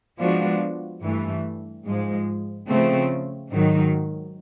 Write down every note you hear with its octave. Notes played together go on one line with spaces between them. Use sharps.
F3 G#3 B3 D4 F#4
G2 E3 A3
G#2 F3 G#3
C#3 F3 A3 C4
G#2 D#3 F#3